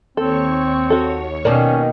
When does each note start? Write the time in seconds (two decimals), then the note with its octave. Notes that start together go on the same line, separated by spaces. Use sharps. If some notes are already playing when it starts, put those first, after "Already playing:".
0.17 D#2 C4 A4 C#5 C#6
0.90 F#4 A4
1.45 B2 D#3 A#3 C#4 D5 A5